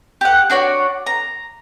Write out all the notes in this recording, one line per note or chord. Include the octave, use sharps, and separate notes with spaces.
G4 F#5
D4 F#4 C#5 D5
A#5